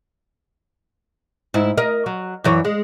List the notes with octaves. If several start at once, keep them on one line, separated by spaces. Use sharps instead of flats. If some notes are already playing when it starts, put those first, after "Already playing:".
G#2 E4
A#4 D#5
F#3
F#2 E3 C#5
G#3